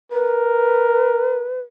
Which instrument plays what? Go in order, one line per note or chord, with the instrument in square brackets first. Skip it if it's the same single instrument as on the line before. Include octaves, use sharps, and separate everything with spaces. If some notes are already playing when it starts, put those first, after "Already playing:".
[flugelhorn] A#4 [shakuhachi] B4